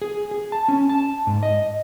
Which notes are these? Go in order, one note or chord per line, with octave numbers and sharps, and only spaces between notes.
G#4
G#4
A5
C#4
A5
G#2
D#5